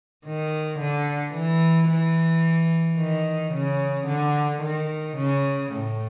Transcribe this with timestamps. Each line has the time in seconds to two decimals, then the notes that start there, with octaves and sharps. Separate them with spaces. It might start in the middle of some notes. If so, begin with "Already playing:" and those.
0.25 D#3
0.79 D3
1.34 E3
1.88 E3
2.98 D#3
3.53 C#3
4.07 D3
4.62 D#3
5.17 C#3
5.72 A2